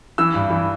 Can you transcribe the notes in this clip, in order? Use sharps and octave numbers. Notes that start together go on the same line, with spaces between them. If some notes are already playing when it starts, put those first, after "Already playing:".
E3 E6
G2
E3